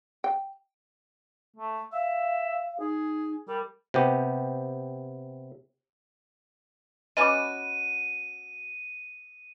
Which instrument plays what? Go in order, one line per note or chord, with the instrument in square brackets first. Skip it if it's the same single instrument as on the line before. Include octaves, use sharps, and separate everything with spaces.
[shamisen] G5
[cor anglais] A3
[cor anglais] E5 [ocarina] F5
[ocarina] D#4 [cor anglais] G#4
[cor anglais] G3 [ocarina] A#4
[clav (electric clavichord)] C3 B3 G4
[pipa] B3 C#4 F#4 [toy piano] D#5 B5 D6 [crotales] D#7